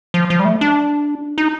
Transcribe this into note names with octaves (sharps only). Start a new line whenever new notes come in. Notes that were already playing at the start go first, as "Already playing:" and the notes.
F3
F3
G3
A3
D4
D#4